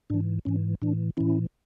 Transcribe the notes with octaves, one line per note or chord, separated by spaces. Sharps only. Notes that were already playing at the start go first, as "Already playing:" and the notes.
G#2 E3 D4
G#2 E3 C#4
A2 E3 D4
A2 E3 C#4 E4